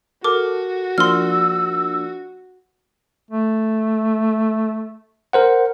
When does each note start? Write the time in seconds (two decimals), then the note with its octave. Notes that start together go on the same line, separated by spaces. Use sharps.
0.24 F#4 A4 A#4 D6
0.98 F3 A#3 D4 C6 E6 F6
3.31 A3
5.33 A#4 C5 F#5